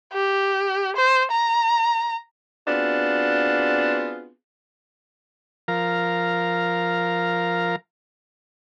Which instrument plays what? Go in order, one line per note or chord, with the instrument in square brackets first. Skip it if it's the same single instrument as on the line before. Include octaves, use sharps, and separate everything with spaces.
[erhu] G4
C5
A#5
[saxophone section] B3 C4 D4 F4 F#4 G#4
[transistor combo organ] F3 A#4 F5 A#5